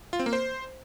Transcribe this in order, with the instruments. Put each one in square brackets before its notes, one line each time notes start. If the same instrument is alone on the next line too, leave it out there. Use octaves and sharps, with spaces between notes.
[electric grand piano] F4
C4
A#3
C5